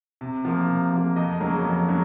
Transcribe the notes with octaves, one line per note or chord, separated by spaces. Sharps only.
C3
F3 A#3
C3
F3 A#3
F2 D#5
C#3 F#3 A#3
F2
C#3 F#3